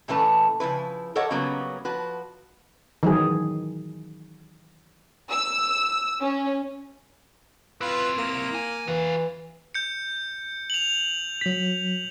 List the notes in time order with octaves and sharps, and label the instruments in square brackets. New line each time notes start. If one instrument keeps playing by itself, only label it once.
[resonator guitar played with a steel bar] A#2 E3 A3 C#4 B4 A5
C#3 F3 E4 B4
G4 A4 A#4 C#5 D#5 F#5
C#3 F#3 G3 A#3 B3 C#4
F3 F#4 B4
[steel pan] D#3 E3 F#3 G#4
[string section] E6
C#4
[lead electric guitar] C4 E4 [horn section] F4 B4
[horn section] A#3
[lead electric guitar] G#5
[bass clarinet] E3 [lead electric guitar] F#4 F5
[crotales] G6 C#7
F7 F#7
[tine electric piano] F#3 B6